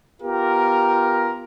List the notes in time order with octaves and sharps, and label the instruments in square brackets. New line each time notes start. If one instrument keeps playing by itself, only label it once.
[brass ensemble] B3 F4 G4 A#4